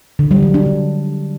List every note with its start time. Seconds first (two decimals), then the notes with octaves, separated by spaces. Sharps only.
0.19 D3
0.31 G3
0.43 F#3
0.54 D4
0.66 D3